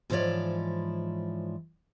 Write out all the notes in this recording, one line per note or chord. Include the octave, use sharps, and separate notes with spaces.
G#2 E3 F3 E4 C#5 D5